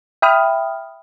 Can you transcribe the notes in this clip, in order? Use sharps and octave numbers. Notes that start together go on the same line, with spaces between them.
E5 G5 B5 D#6 F6